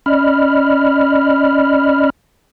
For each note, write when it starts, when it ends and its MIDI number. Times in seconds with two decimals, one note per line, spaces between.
0.06 2.10 61
0.06 2.10 74
0.06 2.10 75
0.06 2.10 83
0.06 2.10 89